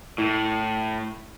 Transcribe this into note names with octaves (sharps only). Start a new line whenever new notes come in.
A2 E4